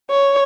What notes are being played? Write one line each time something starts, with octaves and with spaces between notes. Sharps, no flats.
C#5